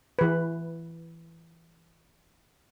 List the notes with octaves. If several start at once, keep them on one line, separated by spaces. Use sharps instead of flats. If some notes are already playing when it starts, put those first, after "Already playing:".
E3 B4